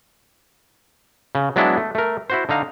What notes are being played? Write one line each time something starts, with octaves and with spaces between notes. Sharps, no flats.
C#3
F#3 G#3 B3 D4 E4
A3
A3 A#4
E4 F#4 C5
D3 D#4 F5 A#5